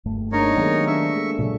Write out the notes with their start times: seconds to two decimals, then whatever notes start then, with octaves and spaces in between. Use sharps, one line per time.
0.05 F#1 G2 A3
0.32 G#3 A#3 D4 D#4 A#4 C#5
0.56 D#3 F#3 A3 B3 G4 G#4
0.87 D4 C5 E5 C#6
1.14 G#3 A#3 A4
1.39 A#2 C#3 F#3